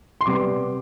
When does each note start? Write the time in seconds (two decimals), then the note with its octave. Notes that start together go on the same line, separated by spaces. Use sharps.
0.21 C6
0.26 C3 G3 B3 D6